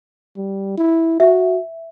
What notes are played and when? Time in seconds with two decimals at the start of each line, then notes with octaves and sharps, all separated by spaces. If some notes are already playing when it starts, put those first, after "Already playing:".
0.37 G3
0.78 E4
1.20 F#4 E5